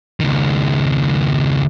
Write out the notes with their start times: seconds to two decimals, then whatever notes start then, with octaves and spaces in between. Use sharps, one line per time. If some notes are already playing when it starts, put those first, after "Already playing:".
0.20 C#2 D#3